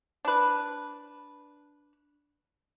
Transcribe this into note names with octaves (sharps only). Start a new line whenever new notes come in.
D4 B4